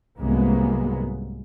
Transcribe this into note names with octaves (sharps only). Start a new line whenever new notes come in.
C2 G#2 F#3 G#3 A#3 B3